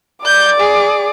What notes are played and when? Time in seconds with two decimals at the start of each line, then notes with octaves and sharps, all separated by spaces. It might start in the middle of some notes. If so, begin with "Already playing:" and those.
0.25 D5 D6 G6
0.60 G#4